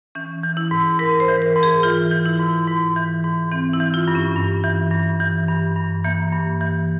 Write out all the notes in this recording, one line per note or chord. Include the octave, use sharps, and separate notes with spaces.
E3 C#4
E3
E4
G#2
G#2 A#4
C5
E3
A#4
G#2
G#4
E3 F4
E3
E4
G#2
G#2
E3
G#2
E3 C4
E4
E3
F4
G2
C#4
G2
E3
G2
E3
G2
G2
E3 A#3
G2
E3